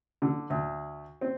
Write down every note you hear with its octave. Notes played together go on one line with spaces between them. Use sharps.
D3
D2
C4